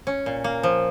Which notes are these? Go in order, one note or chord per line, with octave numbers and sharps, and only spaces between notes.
C#4
A#2
A#3
F3